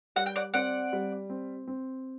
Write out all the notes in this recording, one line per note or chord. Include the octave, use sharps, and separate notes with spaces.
G3 F#5
G5
D5 F#5
C4 D5 F#5
G3
C4
C4